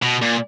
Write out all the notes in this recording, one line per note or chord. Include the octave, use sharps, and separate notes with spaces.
B2
A#2